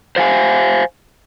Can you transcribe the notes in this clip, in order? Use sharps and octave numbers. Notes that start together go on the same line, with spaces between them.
C5 F5 F#5 G#5